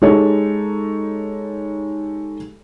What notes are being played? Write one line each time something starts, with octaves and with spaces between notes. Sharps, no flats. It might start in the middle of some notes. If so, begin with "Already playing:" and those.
G#3 D#4 G4 A4 C#5